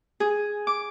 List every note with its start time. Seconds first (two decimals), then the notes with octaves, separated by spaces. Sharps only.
0.20 G#4
0.67 D6